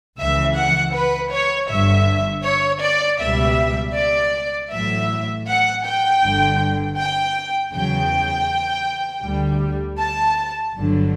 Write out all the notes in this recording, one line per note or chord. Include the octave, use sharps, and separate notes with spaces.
C#2 C#3 E3 E5
F#5
B4
C#5
G1 G2 D3 E5
C#5
D5
C#2 B2 G3 E5
D5
A1 A2 F#3 E5
F#5
G5
G1 G2 D3
G5
E2 C#3 F#3 G5
D2 D3 G3
A5
G1 G2 D3 F#3